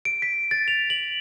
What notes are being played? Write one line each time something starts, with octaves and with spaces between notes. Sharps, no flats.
D7
B6
A6
F7
F#7